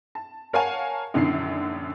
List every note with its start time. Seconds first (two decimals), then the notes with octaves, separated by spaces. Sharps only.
0.15 A5
0.53 A#4 C#5 F5 F#5 G#5 A5
1.14 A#1 F#2 D3 D#3 E4 C7